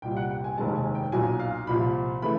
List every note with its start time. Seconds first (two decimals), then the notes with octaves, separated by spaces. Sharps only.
0.02 C2 A#2 G3 G5
0.17 F#5
0.31 G5
0.44 G#5
0.58 F1 D#2 D#3 G#3 A5
0.76 G#5
0.95 G5
1.12 B1 A#2 F#3 G#5
1.39 F5
1.67 C2 A#2 F3 B5
2.22 C#3 E3 A3 B5